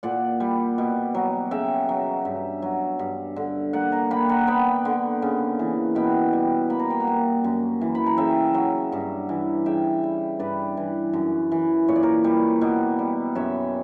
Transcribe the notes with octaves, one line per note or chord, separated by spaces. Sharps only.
A#2 D5 F#5
G3
B2
F#3
C#3 E5 G5
F#3
G2
F#3
G2
D3
A#3 D5 F#5
F#5 A#5
A#3 G5 B5
F#5 A#5
B3 G5 B5
D3
C#3
E3
B2 G5 B5
G3
A#3 B5
A#5
G5
F#5 A#5
A#3
F#2
E3
B5
A#5
C#3 E5 G5
F#3
G2
E3
C#3 E5 G5
G3
G2 B4 D5
E3
F#2
E3
A#2 C#5
D5
A#4 C#5
G3
B2
G3
F#2 C#5 E5